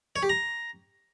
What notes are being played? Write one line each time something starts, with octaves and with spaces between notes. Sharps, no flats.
C#5
G4
A#5